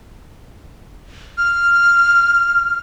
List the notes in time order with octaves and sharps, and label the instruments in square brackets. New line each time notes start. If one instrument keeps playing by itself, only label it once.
[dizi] F6